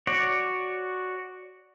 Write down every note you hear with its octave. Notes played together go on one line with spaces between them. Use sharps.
F#4 C#5 D5